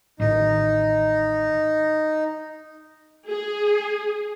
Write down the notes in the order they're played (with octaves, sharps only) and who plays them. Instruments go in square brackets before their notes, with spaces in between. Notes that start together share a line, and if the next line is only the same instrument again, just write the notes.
[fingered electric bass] A1 A2 D#3 [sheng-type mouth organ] D#4
[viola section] G#4